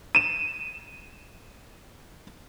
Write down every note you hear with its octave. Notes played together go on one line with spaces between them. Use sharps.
D#7 E7